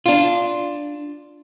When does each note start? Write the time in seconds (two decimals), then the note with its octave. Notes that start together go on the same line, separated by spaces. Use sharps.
0.06 D4 F4